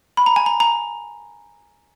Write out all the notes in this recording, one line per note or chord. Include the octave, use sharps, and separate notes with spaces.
B5
A#5
G#5
A#5
A#5